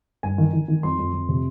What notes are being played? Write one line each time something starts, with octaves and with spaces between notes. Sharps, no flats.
G2 G#5
D#3
D#3
D#3
F2 C6
F2
F2
C3